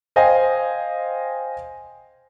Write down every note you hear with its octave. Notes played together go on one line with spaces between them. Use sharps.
C5 D#5 F5 G5 G#5